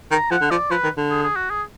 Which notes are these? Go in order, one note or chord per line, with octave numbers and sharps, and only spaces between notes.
D#3 A#5
F3 F#5
D3
F3 D5
F3 B4
D#3
D3
G#4
G#4
F#4
G#4